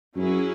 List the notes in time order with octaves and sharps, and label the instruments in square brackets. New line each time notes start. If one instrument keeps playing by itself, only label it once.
[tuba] F#2 [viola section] F#3 C#4 E4 G#4